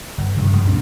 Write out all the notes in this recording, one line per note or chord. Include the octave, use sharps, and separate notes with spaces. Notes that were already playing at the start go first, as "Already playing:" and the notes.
G1
G2 C3 D#3
F#2 C#3 G#3
C#2 A#2 C4 D4